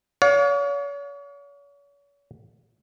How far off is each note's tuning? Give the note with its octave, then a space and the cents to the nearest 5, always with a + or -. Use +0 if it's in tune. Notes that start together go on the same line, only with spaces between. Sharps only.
C#5 +40 F5 +40